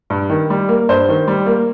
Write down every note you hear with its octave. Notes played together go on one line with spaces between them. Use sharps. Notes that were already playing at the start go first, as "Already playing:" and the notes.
G2
D#3
G3
A#3
G2 C5
D#3
G3
A#3